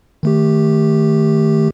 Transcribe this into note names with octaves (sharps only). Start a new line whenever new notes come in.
D#3 A3 G4